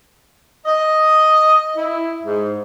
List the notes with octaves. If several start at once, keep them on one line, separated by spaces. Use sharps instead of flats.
D#5
E4
G#2